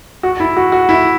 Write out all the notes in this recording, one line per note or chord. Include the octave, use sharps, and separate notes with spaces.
F#4
E4
F#4
F#4
E4